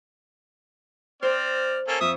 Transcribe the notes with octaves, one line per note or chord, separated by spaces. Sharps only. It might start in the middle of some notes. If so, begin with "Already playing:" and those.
C4 C5 D5 F6
A#3 C#4 A4
F2 E5 D#6